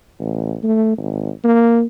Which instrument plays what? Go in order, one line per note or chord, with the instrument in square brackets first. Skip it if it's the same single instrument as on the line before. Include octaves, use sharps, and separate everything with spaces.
[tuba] A1
A3
G#1
A#3